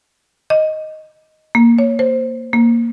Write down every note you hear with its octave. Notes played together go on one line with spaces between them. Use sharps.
D#5
A#3
C#5
C5
A#3